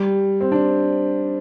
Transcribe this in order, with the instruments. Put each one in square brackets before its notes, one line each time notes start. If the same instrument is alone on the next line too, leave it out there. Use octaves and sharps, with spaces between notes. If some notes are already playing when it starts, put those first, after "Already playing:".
Already playing: [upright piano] G3
C4
D4